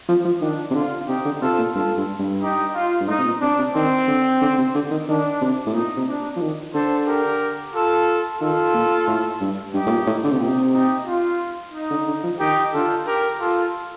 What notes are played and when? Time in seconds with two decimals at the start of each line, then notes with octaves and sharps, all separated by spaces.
0.09 F3
0.25 F3
0.41 D#3 D4
0.70 C3
0.75 D3 F4
1.08 C3 D#4 G4
1.25 D3
1.41 C3 F4 A4
1.58 A#2
1.74 G2 F4 A4
1.97 G2
2.19 G2
2.42 D#4 G4
2.74 F4
3.00 G2
3.08 A2 D#4
3.18 C3
3.25 A#2
3.41 C3 D4
3.58 C3
3.74 D#3 C4
4.08 D3
4.41 D3
4.58 C3
4.75 D3
4.91 D#3
5.08 D#3 D4
5.41 C3
5.66 A2
5.74 A#2 D#4
5.97 C3
6.08 D4
6.36 F3
6.41 D#3
6.74 D3 A4 C5
7.08 G4 A#4
7.74 F4 A4
8.41 D#3 F4 A4
8.74 A#2
9.07 A2
9.40 G2
9.74 G2 D#4 G4
9.86 A2
9.90 A#2
10.07 A2
10.24 D3
10.31 C3
10.40 A#2 D#4 G4
10.48 C3
10.74 D#4 G4
11.07 F4
11.73 D#4
11.90 D3
12.07 D3
12.23 F3
12.40 D#3 D#4 G4
12.73 D3 F4 A4
13.06 G4 A#4
13.40 F4 A4